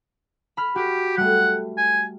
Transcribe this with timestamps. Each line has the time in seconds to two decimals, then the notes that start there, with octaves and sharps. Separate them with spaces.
0.57 B5 F6 B6
0.75 F#4 G4
1.17 G3 A3 F#5
1.77 G#5